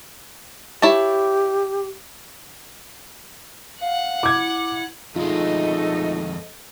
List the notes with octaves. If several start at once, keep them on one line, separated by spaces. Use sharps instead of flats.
E4 G4 C#5 A5
F5 F#5
E4 D6 G#6
F2 G#3 A3 D#4 F4 A4 D#5